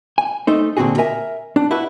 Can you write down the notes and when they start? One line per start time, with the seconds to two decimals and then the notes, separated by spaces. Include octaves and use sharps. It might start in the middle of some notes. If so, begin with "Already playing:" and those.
0.18 G#5
0.47 A3 D#4 C5
0.77 A#2 D3 C4 F#4 G#4
0.98 A#4 E5 G#5
1.56 D4
1.71 E4 F#4 B4